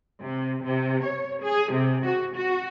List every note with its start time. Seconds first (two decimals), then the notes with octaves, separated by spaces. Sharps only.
0.21 C3
0.63 C3
1.03 C#5
1.42 G#4
1.72 C3
2.04 F#4
2.35 F#4